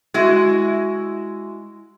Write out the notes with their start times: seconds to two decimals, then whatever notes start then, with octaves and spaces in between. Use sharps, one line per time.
0.14 G#3 E4 F#4